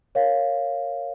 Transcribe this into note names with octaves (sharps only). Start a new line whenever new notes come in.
A#4 C#5 F5